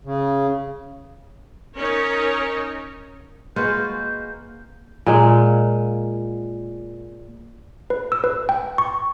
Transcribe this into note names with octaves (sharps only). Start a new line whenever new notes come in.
C#3
C#4 D#4 A#4 C#5
G#3 A#3 F4 F#4 G#4 B4 G6
A#2 G#3 A#3
B4
E6
B4
G5
C#6